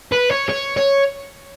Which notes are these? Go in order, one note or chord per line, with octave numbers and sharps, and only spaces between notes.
B4
C#5
C#5
C#5